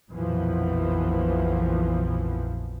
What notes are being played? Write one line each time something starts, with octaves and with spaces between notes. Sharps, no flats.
A#1 F2 B2 E3 F3